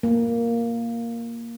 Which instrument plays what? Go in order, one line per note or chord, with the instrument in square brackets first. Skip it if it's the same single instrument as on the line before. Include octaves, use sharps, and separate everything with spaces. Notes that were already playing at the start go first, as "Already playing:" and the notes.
[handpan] A#3